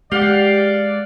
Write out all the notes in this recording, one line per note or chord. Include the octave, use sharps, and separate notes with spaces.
G#3 G4 D5 F5 F#5